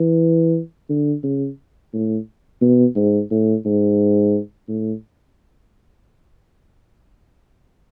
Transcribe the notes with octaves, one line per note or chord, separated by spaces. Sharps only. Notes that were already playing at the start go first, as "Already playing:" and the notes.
Already playing: E3
D3
C#3
A2
B2
G#2
A2
G#2
A2